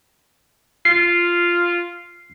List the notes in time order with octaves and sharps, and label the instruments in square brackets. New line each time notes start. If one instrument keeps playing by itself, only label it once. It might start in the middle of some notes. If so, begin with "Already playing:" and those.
[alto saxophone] F4 [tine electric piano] C7